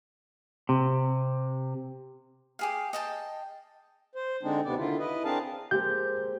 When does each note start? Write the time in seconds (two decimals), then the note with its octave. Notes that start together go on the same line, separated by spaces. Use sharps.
0.69 C3
2.59 G4 G#4 F5
2.93 D#5 G5 A5
4.15 C5
4.43 D3 G#3 C4 D4 D#4
4.65 D#2 C3 B3 D5
4.78 D3 D#3 E4 F4
4.99 E4 B4 D#5
5.25 C4 D4 G#4 A#4 F5 A5
5.71 G#3 A#3 C4 G4 G6